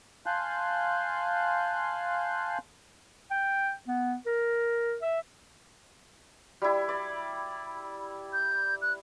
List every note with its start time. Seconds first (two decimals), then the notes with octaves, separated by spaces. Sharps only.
0.26 F5 G#5 A5 C6 F#6 G6
3.31 G5
3.88 B3
4.26 A#4
5.02 E5
6.62 G3 E4
6.89 D5
8.33 G6
8.82 F#6